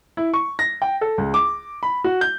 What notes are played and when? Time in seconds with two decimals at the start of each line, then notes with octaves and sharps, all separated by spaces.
0.17 E4
0.34 C#6
0.59 A#6
0.82 G5
1.01 A4
1.18 C#2
1.34 D6
1.83 B5
2.04 F#4
2.21 G6